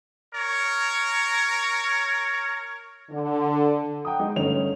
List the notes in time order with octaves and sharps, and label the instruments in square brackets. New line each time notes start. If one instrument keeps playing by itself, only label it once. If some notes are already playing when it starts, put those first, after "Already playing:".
[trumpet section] A#4 C#5
[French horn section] D3
[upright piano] F#5 G5 A#5 D#6
G#3 D#4 G#4
G1 A3 C#4 F7